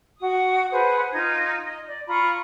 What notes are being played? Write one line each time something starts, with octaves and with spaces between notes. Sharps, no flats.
F#4 D#6
G#4 B4 C5 F#5
D#4 F4 G#6
D#5
D5
F4 A#5 B5 C#6